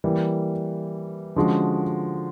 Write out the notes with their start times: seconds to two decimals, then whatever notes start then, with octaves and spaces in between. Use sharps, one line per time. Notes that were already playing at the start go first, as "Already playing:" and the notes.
0.04 E3 G3 A#3
1.36 D3 F3 G#3 C#4 F#4